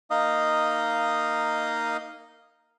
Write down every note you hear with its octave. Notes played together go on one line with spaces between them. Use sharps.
A#3 D#4 D#5 F5 D#6